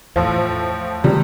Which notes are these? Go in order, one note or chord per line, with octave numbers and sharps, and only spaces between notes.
E2 A2 F3 F4 C5
C#2 C#3 E3 G3 A3